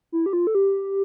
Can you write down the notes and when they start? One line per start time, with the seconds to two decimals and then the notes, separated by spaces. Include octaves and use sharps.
0.12 E4
0.26 G4
0.33 F4
0.47 A4
0.55 G4